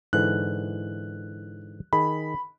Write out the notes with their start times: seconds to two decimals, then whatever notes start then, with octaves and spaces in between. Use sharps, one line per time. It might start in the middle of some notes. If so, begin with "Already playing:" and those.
0.13 G#2 D3 E3 F#6
1.93 D#3 G#4 B5